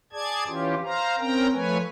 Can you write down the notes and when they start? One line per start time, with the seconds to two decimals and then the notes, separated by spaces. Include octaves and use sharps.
0.13 G#4 D5 A5 G#6
0.47 E3 C#4 F4 G4
0.84 C5 F5 A#5
1.18 C4 C#4 A#4 G5 A#5
1.52 F3 A3 B4 C#5 G#5